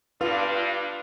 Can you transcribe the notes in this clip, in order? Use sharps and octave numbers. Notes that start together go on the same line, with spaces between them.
G2 D4 F4 B4